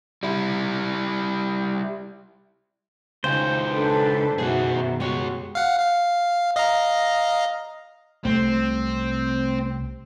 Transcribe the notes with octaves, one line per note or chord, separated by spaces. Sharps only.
G3 E4
C#2 C#3 E3 D#4 C5 G5
D4 A4 B4
F#2 B2 D#3 D#4 E4 F#4 G#4 F#5
G#3 F#4 G4 C#5
F5 F#5
F5
D#5 F5 A#5
C2 C3 F#3 A3 C4